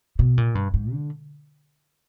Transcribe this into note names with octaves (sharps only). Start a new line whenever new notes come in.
B2
A#2
G2
G#2
D3